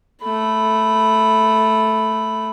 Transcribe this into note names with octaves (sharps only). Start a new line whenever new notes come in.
A3 B5